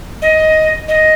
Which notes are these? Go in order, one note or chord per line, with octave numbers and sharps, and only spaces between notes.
D#5
D#5